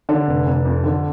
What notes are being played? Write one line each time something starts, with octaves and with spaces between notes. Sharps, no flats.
D3 D4
F1
F1
F2
D3